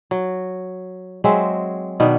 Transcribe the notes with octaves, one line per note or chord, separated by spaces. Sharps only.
F#3
F#3 G#3 C4 E5
B2 D#3 B3 D4